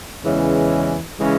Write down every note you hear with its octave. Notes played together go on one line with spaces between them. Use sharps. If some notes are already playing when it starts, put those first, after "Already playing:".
E2 C#3 E3 G#3 C#4
C#3 E3 G#3 C#4